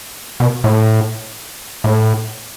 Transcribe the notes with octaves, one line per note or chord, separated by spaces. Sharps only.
B2
A2
A2